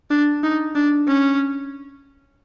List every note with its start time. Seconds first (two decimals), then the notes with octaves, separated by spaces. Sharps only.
0.10 D4
0.43 D#4
0.75 D4
1.08 C#4